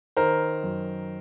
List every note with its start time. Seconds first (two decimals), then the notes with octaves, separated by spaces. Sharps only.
0.17 D#3 A#4 C5
0.63 F#2